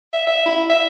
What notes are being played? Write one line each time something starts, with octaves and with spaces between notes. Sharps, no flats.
E5
E5
E4
E5